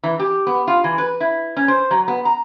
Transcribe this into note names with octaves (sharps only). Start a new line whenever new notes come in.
E3
G4
B3
F4
E3
B4
E4
C#4
C5
F#3
B3
A#5